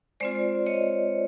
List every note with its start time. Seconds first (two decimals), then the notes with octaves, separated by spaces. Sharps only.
0.20 G#3 C4 F4 C5 D5
0.67 C#5 D#5